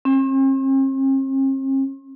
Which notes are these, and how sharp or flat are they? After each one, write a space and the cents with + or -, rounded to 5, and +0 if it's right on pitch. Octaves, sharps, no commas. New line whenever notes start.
C4 +45